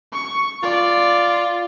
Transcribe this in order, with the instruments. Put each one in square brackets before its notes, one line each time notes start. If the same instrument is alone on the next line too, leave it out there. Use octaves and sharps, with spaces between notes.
[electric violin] C#6
[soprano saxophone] F4 [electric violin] D5